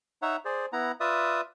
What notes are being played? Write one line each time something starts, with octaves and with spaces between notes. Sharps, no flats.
D#4 C#5 E5 F#5
G#4 C5 D5
B3 E4 F#5 A#5
F4 B4 D5 E5 D#6